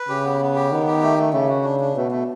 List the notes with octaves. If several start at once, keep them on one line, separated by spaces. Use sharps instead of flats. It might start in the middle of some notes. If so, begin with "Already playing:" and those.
Already playing: B4
C#3 G4
B3
B3
G4
D#3 B3
G4
A3
A3
C#3 A3
F#4
D4
D4
B2 A3
A3